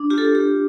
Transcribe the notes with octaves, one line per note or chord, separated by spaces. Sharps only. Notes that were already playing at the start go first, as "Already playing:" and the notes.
Already playing: D4
F4 G4
A4
G4
G4
F4